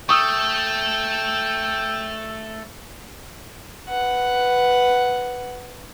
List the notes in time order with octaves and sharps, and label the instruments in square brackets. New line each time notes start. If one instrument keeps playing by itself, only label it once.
[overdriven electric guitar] A3 [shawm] G5 [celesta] C#6 D#6 E6
[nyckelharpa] B4 F#5